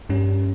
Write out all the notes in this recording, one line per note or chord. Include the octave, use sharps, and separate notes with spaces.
G2 G3 C#4